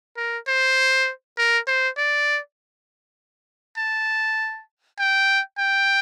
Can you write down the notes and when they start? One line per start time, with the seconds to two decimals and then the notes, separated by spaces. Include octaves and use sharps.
0.17 A#4
0.48 C5
1.38 A#4
1.67 C5
1.97 D5
3.78 A5
4.99 G5
5.58 G5